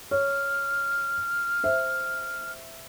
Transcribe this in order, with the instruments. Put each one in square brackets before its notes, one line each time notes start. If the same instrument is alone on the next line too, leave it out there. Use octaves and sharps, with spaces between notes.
[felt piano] C#5 [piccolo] F6
[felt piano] C5 E5